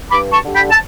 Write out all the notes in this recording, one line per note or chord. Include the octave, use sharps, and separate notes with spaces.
G2 B5 D6
A5 C#6
D3 G3
G5 B5
A5